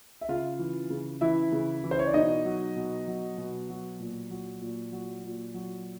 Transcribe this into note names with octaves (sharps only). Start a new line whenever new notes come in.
E5
C#3 F4 F5
E3
C#3
E3 E4 E5
C#3
E3
C5
C#5
D5
B2 D#4 D#5
F#3
B2
F#3
B2
F#3
A#2
F#3
A#2
F#3
A#2
F#3